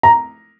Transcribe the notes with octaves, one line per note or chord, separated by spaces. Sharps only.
A#5